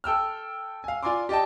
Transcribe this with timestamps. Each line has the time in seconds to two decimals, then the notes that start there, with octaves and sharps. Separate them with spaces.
0.04 A4 G5 E6 F6
0.84 F5 G#5
1.03 F4 D5 G#5 A#5 C6 D6
1.29 G4 D5 D#5 G5 A5